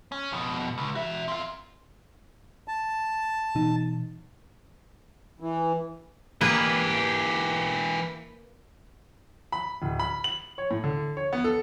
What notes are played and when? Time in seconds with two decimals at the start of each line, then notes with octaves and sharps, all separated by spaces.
0.12 C#4
0.32 F2 B2
0.78 C#2
0.95 F#4 E5
1.28 C4 F4
2.68 A5
3.55 B2 E3 D#4
5.40 E3
6.41 E3 A#3 G4 G#4 B4
9.52 B5
9.82 D1
9.99 B5
10.24 F#7
10.58 C#5
10.71 A2
10.84 D3
11.17 C#5
11.33 B3
11.44 A4